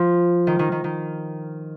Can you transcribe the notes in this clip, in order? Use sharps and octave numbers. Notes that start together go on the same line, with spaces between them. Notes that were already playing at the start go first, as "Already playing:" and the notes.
Already playing: F3
D#3
D#3
D#3
D#3